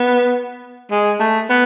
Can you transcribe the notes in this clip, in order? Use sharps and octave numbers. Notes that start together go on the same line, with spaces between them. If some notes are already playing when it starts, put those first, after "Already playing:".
Already playing: B3
G#3
A3
B3